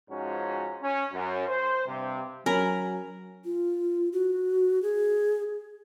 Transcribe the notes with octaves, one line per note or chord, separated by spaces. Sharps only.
G#2 F3 C#4 F#4 A#5
C#4
F#2
C5
G2 C3
F#3 C#4 A#4 G#5 B5
F4
F#4
G#4